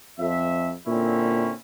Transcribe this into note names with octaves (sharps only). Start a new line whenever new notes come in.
F2 E5
A#2 D3 C4 C#4 E4